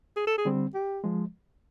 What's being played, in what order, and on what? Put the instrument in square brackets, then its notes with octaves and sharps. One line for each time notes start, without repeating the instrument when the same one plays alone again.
[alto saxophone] G#4
A4
G#4
[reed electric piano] D3 G3 C4
[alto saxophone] G4
[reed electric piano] F3 G#3